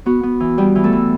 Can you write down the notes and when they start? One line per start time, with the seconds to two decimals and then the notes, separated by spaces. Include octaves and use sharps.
0.06 B3 F#4
0.23 B3
0.40 E3
0.58 G3 B3 G4
0.75 E3
0.84 A3 A4
0.93 E3